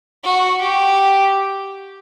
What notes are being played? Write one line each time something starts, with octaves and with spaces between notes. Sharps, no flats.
F#4
G4